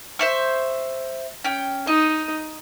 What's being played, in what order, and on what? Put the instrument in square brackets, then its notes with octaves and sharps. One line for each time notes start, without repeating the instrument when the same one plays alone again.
[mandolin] C5 E5 C#6
C#4 G5
[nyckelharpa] D#4 [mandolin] D#5